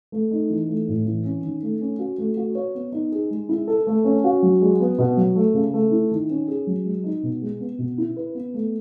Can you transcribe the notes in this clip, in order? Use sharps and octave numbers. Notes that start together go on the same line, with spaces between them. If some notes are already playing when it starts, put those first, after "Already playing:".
A3
D#4
E3
A3
A2
E3
C#4
D#3
A3
C#4
F#4
A3
F#4
C#5
B3
D#4
G#4
G#3
E4
A4
A3
C#4
F#4
F#3
G#3
B3
B2
F#3
A3
C#3
A3
E4
D#3
C#4
G#4
F#3
G#3
D#4
B2
G#3
B3
B2
E4
B4
B3
A3